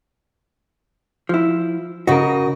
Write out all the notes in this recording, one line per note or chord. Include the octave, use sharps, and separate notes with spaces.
F3 E4
C#3 F#4 A#4 D#5